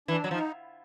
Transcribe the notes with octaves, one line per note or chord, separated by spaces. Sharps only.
E3 D4
F#3
F3 D#4